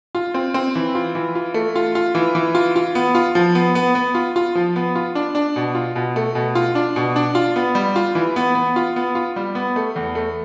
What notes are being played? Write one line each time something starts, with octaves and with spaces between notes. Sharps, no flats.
F4
C4
C4
E3
F4
E3
F4
A3
F4
F4
E3
E3
F4
F4
B3
F4
F3
B3
B3
B3
F4
F4
F3
B3
F4
D4
D4
B2
F4
B2
A3
B2
F4
D4
B2
D4
F4
B3
G3
F4
E3
B3
B3
F4
B3
F4
G3
B3
A3
E2
A3